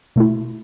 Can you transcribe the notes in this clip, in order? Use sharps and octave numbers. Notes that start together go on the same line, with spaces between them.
B2 A3 E4